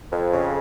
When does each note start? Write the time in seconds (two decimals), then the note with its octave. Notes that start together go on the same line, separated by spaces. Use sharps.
0.12 F2
0.33 C#3